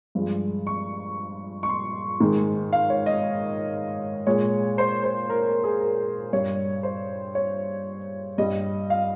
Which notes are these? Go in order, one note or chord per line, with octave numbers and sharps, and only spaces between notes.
G2 F3 G#3
C#6
C#6
C6
G#2 D#3 G#3
F5
C#5
D#5
A#2 G#3 C#5
C5
C5
A#4
A#4
G#4
A#4
G2 G3 C#5
C5
C#5
G2 G3 D#5
F5